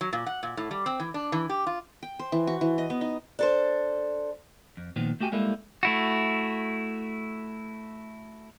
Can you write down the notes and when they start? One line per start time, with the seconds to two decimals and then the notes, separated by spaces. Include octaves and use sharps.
0.01 F#3
0.13 A#2
0.26 F#5
0.43 A#2
0.57 A2
0.71 G3
0.86 C4
1.00 E3
1.14 D4
1.32 E3
1.49 G4
1.67 F4
2.03 G5
2.19 C5
2.32 E3
2.47 F#4
2.61 E3
2.78 D#5
2.90 B3
3.01 D#4
3.39 D4 A4 C5
4.77 F2
4.96 A#2 D#3 F3 B3
5.20 A3 F#4 G4 G5 G#5
5.32 G3 G#3 A#3 E4 F4 A4
5.83 A3 E4 F#4